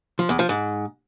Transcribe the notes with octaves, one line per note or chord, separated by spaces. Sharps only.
F3
E2
F3
G#2